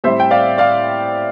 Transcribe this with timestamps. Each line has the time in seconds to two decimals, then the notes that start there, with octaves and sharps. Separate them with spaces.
0.04 A2 G3 C4 C5 E5
0.20 G5
0.31 D5 F5
0.58 D5 F5